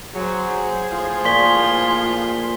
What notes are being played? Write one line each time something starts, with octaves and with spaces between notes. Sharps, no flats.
F#3 G#4 C5
A2 F3 F4
A#2 C6 C#6 B6 G7